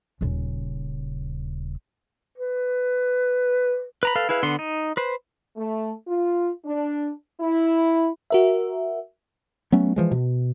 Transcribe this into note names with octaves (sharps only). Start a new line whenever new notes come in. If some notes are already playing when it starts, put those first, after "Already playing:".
D#1 C#3
B4
B4 A#5 B5
A4 B4 F5
E4 G#4 B4 F5
D3 B3 F#5 C6
D#4
B4 C5
A3
F4
D4
E4
F#4 A#4 E5
F#3 A3 B3 C#4
E3 F3 G#3
B2